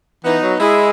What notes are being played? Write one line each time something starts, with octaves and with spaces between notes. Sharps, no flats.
E3 B3 D#4
F#3
G#3 E4 G#4